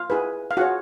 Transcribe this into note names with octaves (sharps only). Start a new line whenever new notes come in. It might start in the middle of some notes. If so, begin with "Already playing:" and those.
Already playing: F4 F5
E4 G#4 B4
F5
F4 F#4 G#4 C#5 F#5